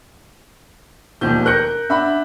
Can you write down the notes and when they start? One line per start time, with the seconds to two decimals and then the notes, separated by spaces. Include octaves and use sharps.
1.21 E1 D#2 F3 G6
1.45 A#4 F#6 G6 A#6 C#7
1.89 D4 E5 F#5 B5